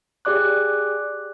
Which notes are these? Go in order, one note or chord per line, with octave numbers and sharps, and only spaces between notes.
G4 G#4 D5 D6 F#6